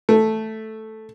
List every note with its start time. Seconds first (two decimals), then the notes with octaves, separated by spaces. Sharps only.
0.09 A3